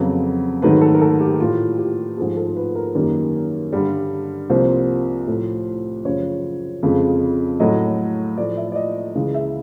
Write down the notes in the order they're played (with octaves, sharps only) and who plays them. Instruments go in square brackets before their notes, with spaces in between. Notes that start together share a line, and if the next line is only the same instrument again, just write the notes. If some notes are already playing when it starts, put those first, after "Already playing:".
Already playing: [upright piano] F2 C#3 F#3 B3
G#2 D#3 F#3 A3 B4
A4
A#4
A4
G4
A2 E3 A3 F4
G4
G#2 F3 A3 G#4
A4
B4
A#4
F#2 D#3 G3 A#3
G2 D3 G3
C2 C3 F3 A#3 C5
A2 F3 A3
F#2 C#3 F3 C#5
F2 C#3 F3 G#3
A2 F#3 A3 D#5
A2 F3 A3 D5
E5
D5
D#5
C#2 C#3 E3 G#3
E5